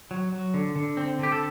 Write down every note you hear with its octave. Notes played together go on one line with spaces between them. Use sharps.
F#3
F#3
D3
D3
C4
D3 G4
A4